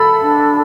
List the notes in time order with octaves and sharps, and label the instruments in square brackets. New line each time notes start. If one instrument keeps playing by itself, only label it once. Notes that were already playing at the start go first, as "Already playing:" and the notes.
Already playing: [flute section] A4 [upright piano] B5
[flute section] D4